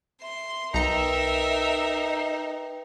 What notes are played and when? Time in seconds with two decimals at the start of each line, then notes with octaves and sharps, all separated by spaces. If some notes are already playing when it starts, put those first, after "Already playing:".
0.22 E5 C6
0.74 B1 D#4 A#4 B4 E5 G5 A#5 C#7